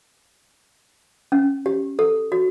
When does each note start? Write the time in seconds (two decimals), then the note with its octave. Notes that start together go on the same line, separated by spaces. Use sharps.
1.32 C#4
1.66 G4
1.99 A4
2.32 F#4